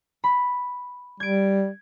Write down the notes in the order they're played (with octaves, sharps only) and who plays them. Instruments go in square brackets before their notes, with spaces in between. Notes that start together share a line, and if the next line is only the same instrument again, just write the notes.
[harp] B5
[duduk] G3 [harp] G#6 D7